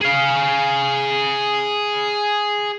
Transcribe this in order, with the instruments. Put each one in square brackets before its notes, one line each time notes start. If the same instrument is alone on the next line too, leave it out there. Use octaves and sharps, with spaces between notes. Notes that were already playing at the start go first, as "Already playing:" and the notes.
[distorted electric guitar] G#4 F5